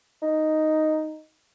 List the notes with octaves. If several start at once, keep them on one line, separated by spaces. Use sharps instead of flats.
D#4